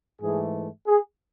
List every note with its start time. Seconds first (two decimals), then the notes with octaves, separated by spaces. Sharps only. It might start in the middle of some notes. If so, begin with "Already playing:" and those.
0.20 G#2 E3 A3 G#4
0.87 G#4